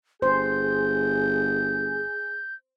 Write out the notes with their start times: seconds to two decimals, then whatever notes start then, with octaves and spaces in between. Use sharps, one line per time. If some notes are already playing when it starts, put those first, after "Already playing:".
0.22 G1 G#4 C5 G6